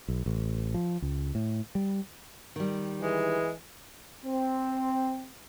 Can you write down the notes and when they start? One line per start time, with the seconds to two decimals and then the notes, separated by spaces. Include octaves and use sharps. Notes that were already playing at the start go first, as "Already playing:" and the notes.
0.08 B1
0.26 A1
0.74 F3
1.02 C#2
1.35 A2
1.75 G3
2.56 D#3 G3
3.01 E3 G#3
4.25 C4